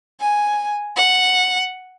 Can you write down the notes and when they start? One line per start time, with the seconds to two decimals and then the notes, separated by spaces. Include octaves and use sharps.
0.20 G#5
0.96 F#5